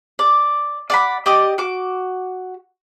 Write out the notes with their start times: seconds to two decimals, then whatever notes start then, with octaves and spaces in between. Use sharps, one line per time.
0.19 D5
0.90 D5 F#5 B5
1.26 G4 D5 D#5
1.58 F#4 D6